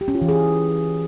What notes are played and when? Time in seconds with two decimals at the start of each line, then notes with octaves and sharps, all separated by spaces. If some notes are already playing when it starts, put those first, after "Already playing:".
0.01 G4
0.08 C#4
0.15 F4
0.22 E3
0.29 G#4